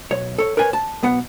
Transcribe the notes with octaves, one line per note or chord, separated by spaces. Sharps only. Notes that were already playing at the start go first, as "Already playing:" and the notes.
B1 C#5
A4 C#5
A#4 B4 C#5 G#5
A5
B1 B3 F#5